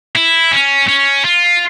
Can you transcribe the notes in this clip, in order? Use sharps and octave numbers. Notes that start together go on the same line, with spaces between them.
E4
C#4
C#4
F4